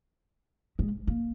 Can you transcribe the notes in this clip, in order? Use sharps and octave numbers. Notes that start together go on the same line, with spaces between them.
G#3
A#3